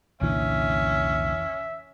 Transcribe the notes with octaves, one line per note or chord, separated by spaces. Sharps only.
F1 C2 A#2 D3 E3 C#4 E5